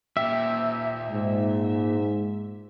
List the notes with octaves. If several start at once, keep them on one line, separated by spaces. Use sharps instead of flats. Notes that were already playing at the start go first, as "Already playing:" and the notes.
A#2 G4 E5
G#2